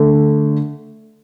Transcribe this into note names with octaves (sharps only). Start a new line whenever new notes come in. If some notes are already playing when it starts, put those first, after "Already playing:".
Already playing: D3 A3